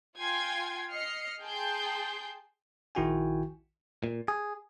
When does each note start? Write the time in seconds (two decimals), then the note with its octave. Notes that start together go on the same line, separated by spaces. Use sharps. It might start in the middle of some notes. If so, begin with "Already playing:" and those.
0.17 F4 F5 G5 G#5 C6 G#6
0.92 D#5 F6 C7 C#7
1.41 G#4 G5 A5 C6 G6
2.95 A#1 D#3 E4 F#4 G5 G#5
4.04 A#2
4.28 G#4